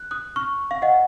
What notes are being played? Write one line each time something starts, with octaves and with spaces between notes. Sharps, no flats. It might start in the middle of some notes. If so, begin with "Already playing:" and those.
Already playing: F#6
D#6 F#6
C#6 F6
F5
D#5 F#5